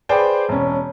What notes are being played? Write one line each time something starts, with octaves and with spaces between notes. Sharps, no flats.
G#4 B4 C5 D5 G5
E1 C#4